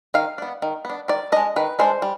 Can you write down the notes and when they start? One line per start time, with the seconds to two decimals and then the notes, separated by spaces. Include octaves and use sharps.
0.14 D#3 F5
0.38 B3 D4
0.62 D#3
0.85 B3 D4
1.08 D#3 D5
1.32 G#3 D4 D#5
1.56 D#3 B4
1.79 G#3 D4 C5
2.02 G3